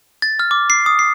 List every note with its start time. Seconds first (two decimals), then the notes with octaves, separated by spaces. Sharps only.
0.22 A6
0.39 F6
0.51 D6
0.70 C7
0.86 D#6
0.99 C7